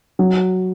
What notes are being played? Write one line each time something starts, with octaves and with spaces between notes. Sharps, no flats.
F#3